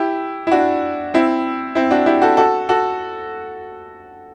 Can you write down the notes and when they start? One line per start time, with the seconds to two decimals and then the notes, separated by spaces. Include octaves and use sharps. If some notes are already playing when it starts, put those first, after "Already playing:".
Already playing: E4 G4
0.47 E4
0.51 D4 F#4
1.14 C4 E4
1.75 C4 E4
1.91 D4 F#4
2.06 E4 G4
2.22 F#4 A4
2.37 F#4 A4
2.69 F#4 A4